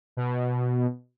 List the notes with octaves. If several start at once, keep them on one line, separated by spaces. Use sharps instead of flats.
B2